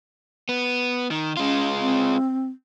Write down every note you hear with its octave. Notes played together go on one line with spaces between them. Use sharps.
B3
D#3
G#3 C#4 F4
C4